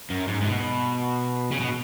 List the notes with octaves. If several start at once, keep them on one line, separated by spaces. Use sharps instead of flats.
F#2
G#2
G#2
B2
C#3
B2